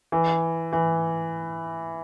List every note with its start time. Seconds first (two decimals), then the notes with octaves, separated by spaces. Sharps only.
0.12 E3
0.73 E3